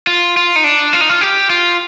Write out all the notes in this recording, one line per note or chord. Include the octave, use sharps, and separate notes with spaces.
F4
F4
D#4
D4
F4
D#4
F4
G4
F4